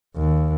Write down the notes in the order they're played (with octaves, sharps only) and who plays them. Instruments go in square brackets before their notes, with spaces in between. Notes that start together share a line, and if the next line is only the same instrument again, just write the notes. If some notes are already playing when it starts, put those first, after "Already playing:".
[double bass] D#2